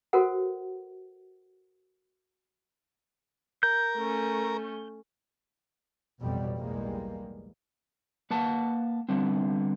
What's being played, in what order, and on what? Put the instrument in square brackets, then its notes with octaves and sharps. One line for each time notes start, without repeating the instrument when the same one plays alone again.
[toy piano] F#4 A4 A#4 C5 F#5
[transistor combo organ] A#4 [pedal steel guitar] G6
[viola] A3 C#4
[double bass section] A1 F2 B2 F#3 G3
B1 E2 G3 G#3 A#3
[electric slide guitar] A#3 B4 F#5 A5
D3 G3 B3 C4